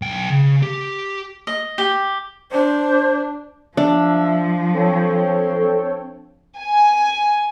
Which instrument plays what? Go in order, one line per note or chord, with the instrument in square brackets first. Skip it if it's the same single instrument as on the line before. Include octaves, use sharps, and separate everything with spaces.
[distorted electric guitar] B1 G5
C#3
G4
[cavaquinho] D#5
G4
[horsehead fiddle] D4 [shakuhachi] C5
[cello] F3 [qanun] D4 [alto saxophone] E5
[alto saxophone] C4 [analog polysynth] A4 C#5 G5
[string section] G#5